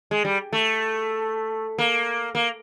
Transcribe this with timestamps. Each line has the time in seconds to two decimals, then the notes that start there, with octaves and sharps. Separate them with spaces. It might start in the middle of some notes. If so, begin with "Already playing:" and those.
0.11 G#3
0.25 G3
0.53 A3
1.79 A#3
2.35 A#3